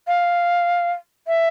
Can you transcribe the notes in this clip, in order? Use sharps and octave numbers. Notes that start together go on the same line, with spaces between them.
F5
E5